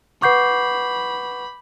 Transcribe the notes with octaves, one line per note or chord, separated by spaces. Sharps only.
B4 F#5 B5 C#6 D6 G6 C7